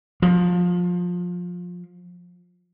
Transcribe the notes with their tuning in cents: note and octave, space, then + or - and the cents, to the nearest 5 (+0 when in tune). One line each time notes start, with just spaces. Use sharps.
F3 +20